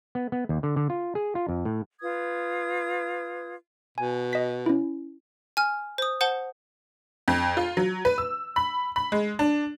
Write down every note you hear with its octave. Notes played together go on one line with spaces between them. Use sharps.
B3
B3
D#2
D3
D3
F4
G#4
F4
F2
A2
F4 B4 D#6 G#6
B2 G#5
D#5 B6
C#4 E4
G#5 F6
C5 D#6
C5 F#5 A5 G7
F2
F4
F#3
B4
E6
B5
B5
G#3
D4